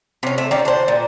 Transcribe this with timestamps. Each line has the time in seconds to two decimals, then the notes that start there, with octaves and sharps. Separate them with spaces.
0.23 C3 C#4
0.38 A3
0.51 D#3 C4 C#4 D5
0.65 D4 C5
0.88 A#2